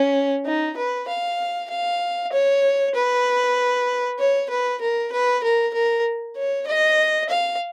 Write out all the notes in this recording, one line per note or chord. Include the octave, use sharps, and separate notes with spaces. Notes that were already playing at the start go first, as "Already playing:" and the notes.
Already playing: C#4
D#4
B4
F5
F5
C#5
B4
C#5
B4
A#4
B4
A#4
A#4
C#5
D#5
F5